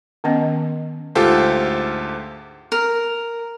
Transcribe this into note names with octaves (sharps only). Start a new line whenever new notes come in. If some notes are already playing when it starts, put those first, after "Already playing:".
D#3 B3 C#4 D#5
D2 G#2 F4 G4 A4 C5
A#4